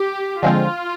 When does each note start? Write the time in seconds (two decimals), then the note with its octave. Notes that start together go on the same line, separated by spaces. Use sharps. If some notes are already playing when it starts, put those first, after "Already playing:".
Already playing: G4
0.43 D3 F3 G#3 C4 F4